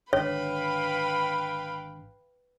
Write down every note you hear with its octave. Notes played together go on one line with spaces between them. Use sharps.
G#1 D3 B4 C#5 F5 G5 B5